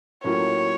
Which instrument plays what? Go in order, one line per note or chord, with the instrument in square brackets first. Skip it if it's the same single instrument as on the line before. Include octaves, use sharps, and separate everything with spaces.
[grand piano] A2 F#3 A#3 C#4 F4 [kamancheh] C#5